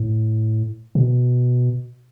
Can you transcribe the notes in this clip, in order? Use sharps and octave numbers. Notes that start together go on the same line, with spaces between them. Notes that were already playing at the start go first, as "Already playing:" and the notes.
Already playing: A2
B2